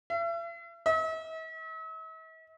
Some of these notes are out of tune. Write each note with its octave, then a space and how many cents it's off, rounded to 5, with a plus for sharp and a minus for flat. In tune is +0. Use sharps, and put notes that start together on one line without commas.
E5 +40
E5 -45